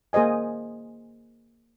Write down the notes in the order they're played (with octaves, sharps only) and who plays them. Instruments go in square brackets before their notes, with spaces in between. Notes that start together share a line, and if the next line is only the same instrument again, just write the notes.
[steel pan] A#3 G#4 C5 D#5 G#5